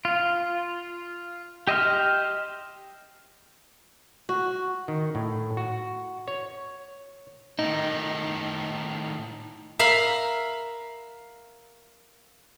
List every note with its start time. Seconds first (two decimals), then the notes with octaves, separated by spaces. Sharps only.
0.05 F4
1.67 G4 D#5 E5 C6 F6
4.29 F#4
4.88 D#3
5.15 A2
5.57 F#4
6.28 C#5
7.59 A2 D#3 D#4
9.79 A#4 E5 F5 B5